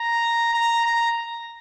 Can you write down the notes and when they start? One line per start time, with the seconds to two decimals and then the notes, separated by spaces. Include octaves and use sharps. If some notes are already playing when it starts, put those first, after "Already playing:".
Already playing: A#5
0.53 A#5
0.85 A#5